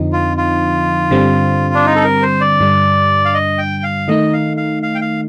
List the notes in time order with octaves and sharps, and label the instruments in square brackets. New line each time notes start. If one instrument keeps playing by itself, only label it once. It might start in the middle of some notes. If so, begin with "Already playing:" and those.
Already playing: [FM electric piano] F2 D3 F3 C4 D#4
[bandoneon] F4
F4
[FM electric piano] G2 D3 G3 C4
[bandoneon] D4
D#4
A4
A#4
C5
D5
[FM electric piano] G2 D3 G3 D4
[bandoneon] F5
D#5
G5
F5
[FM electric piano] D#3 A3 D#4 [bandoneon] D#5
[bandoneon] F5
F5
F5
G5
F5